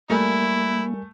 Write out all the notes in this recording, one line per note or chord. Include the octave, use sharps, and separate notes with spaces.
G3 A3 A#3 E4 A#4 G#5